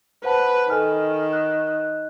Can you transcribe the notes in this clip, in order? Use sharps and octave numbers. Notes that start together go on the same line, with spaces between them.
B4 C5 F#5 A5
D#3 A4 G#5 F6
F#6
F#6